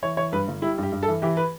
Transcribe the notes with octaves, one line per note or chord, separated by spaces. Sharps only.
E3 C#5
E3 C#5
G2 B4
G1
G3 E4
G2 G4
G2
A4
E3
E3 G4
B4